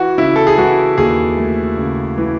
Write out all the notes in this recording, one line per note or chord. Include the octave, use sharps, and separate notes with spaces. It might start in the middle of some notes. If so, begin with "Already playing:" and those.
Already playing: E3 F#4
C#3 E4
A4
G#4
E3 F#4
D#2 G#4
A3
C#3
E3